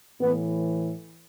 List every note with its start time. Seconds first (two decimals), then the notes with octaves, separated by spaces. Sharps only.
0.21 A2 E3 B3